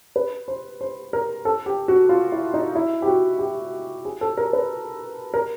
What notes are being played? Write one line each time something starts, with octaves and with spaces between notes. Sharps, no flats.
B4
C5
C5
A#4
A4
G4
F#4
F4
E4
D#4
E4
G4
F#4
G4
G#4
A4
A#4
B4
A#4